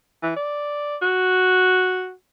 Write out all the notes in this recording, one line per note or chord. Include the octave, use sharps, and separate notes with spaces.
E3
D5
F#4